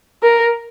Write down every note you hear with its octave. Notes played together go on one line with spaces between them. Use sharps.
A#4